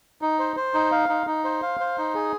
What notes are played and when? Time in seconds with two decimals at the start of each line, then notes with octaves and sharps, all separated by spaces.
0.22 D#4
0.39 C5
0.57 C5
0.74 D#4
0.92 F5
1.09 D#4
1.27 D#4
1.44 C5
1.62 F5
1.80 C5
1.98 D#4
2.14 G#4